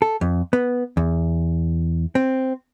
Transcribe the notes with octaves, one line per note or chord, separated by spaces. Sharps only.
A4
F2
B3
E2
C4